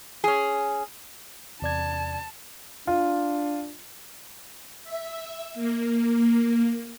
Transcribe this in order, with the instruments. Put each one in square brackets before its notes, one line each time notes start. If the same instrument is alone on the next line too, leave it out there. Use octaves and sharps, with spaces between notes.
[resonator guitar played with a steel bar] C#4 G#4
[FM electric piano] E2 [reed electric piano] C3 D5 G#6 [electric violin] A5
[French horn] D4 [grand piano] F4
[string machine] E5
A#3